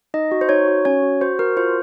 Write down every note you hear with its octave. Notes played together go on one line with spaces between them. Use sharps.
D#4 D#5
F#4
C5
D#4 C#5
F#4
C#4 C#5
F#4
F#4 C5
F#4 A#4
F4 C5